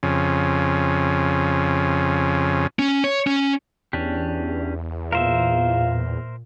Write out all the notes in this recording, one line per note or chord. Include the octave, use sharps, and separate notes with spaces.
F2 C#3
C#4
C#5
C#4
E2 C#4 D4 G4
A#2 F4 A#4 C5 E5